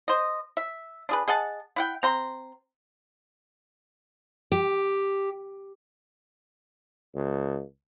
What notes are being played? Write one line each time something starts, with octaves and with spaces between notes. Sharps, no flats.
C5 D#5
E5
D4 G#4 B4
G#4 D#5 F#5 A5
E4 F#5 G5
C4 A#5 C6
G4
C#2